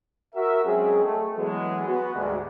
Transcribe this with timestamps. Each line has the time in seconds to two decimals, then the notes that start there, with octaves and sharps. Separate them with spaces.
0.35 F#4 A#4 E5
0.65 F#3 G#3 C4 C#4 G#4
1.04 A3
1.37 E3 F#3 G#3 B3
1.87 B3 F#4
2.15 D2 G#2 D3 G3 G#3